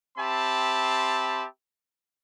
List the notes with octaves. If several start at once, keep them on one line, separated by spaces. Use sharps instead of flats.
C4 G4 E5 A5 B5 C6